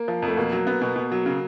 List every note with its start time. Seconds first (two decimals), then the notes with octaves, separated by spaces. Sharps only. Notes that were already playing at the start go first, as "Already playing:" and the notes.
Already playing: A#3
0.08 F3
0.22 F2
0.28 A3
0.37 B2 A#3
0.52 F#3
0.67 B3
0.82 B2
0.96 B2
1.12 F#3
1.26 C#3